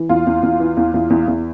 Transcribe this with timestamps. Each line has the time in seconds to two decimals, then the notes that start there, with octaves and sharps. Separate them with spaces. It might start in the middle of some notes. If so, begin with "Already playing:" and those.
Already playing: E3
0.09 E2 F4
0.27 E2
0.43 E2
0.60 E3
0.77 E2
0.94 E2
1.10 E2
1.28 E2